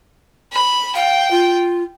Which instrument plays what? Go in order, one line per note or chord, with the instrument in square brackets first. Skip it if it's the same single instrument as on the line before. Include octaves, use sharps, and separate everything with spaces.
[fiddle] B5
[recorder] F5 [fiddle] G5
[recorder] F4